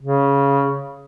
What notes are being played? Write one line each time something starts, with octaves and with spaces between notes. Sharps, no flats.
C#3